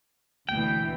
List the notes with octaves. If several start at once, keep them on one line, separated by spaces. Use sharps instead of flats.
D2 B2 E3 G5